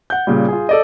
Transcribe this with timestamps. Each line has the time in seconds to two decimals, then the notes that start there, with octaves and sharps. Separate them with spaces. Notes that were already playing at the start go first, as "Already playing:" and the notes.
0.10 F#5 G6
0.27 A#2 C#3 G3
0.49 F4 G#4
0.69 A4 D5 D#5